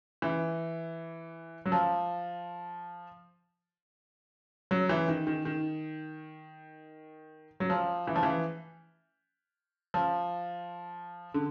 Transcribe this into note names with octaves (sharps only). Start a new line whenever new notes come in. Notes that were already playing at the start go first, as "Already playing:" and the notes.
E3
F#3
F3
F#3
E3
D#3
D#3
D#3
F#3
F3
E3
F3
E3
F3
D3